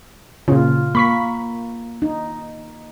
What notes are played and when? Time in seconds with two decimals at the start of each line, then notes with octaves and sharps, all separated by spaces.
0.48 A#2 C#3 F4
0.95 A#3 B5 C#6 B6
2.02 D#4